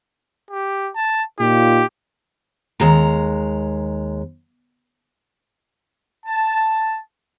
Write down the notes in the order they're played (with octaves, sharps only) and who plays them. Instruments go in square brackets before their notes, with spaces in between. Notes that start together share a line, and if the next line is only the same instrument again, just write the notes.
[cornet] G4
A5
[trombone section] A#2 D#4 F4 [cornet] G4
[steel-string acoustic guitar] D#2 G#3 A#5
[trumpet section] A5